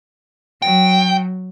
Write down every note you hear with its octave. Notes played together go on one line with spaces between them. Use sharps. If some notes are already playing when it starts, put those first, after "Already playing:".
F#3 G5